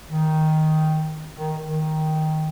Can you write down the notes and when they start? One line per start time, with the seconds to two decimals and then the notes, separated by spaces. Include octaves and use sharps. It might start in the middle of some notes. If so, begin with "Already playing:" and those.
0.10 D#3
1.37 D#3
1.64 D#3